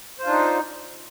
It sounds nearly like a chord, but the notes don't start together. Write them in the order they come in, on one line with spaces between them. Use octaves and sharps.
C5 F4 D4 D#4